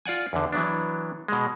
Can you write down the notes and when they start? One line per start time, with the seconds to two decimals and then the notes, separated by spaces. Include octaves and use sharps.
0.05 F4 D5 F#5 G#5
0.33 E2 D3
0.52 E3 F#3 B3 D4
1.28 B2 G#3